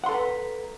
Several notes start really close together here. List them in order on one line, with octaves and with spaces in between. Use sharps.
F#5 C6 A4 A#5 B4